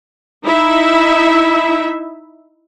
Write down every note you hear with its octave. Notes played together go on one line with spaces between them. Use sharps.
D#4 E4 E5